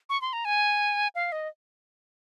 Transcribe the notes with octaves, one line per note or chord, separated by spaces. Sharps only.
C#6
C6
A#5
G#5
F5
D#5